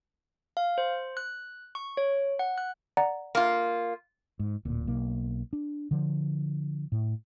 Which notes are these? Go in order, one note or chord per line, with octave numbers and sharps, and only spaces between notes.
F5
C5
F#6
C#6
C#5
F#5
F#6
D5 F#5 A#5
A#3 F4
G#2
D1 A#2
B1 A#3
D4
D3 F3
A2